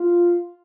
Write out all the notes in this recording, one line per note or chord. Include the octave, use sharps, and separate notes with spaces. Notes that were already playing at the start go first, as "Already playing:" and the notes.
Already playing: F4